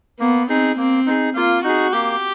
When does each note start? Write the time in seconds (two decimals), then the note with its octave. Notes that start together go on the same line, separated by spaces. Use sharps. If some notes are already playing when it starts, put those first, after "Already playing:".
0.19 A#3 B3
0.49 C4 D#4 G#4
0.77 A#3 C4
1.06 D#4 G#4
1.35 A#3 F4
1.64 D#4 F#4 G#4
1.93 A#3 G4